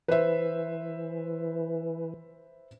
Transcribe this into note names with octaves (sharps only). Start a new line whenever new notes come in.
E3 B4 C5 E5